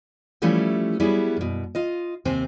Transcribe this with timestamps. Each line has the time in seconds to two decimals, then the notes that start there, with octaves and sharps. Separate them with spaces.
0.42 E3 F3 G3 A3 C#4 E4
1.00 F#3 G3 B3 E4 G#4
1.37 F#2 B2
1.75 F4 D#5
2.25 D#2 C3 C4 C5 G#5